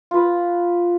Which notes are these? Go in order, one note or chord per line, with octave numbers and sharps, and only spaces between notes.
F4 B4